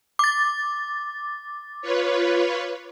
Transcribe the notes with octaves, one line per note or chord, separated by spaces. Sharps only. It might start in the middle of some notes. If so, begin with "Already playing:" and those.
D6 A6
F4 B4 C#5